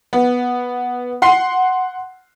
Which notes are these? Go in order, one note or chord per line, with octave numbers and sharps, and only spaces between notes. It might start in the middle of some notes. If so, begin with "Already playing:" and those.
B3
F#5 C6 C7